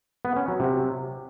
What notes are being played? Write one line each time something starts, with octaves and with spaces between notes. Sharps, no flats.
B3
C#4
F#3
C3